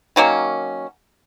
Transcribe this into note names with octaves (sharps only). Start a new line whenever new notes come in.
D#3 F#3 A#3 C#4